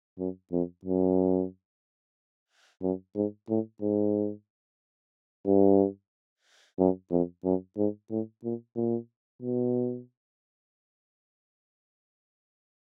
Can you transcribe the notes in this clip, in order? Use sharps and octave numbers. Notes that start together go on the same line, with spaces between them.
F#2
F2
F#2
F#2
G#2
A2
G#2
G2
F#2
F2
F#2
G#2
A2
A#2
A#2
B2